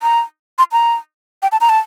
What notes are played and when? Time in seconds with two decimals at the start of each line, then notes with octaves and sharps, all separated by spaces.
0.02 A#5
0.58 C6
0.72 A#5
1.42 G5
1.52 A5
1.61 A#5
1.69 A5